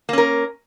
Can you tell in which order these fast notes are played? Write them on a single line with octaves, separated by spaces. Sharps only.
A#3 C#4 A#4